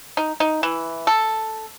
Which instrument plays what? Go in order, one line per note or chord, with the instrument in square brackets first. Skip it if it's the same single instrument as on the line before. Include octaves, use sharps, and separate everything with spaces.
[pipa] D#4
D#4
E3
A4